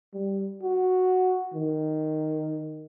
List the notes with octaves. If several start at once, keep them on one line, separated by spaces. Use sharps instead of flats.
G3
F#4
D#3